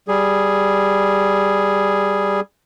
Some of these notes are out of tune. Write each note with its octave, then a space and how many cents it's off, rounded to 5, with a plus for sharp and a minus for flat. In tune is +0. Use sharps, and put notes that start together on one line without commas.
G3 +0 G#4 +0